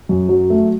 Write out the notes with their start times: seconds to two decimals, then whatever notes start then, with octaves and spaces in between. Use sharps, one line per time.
0.09 F#2
0.29 F#3
0.50 A3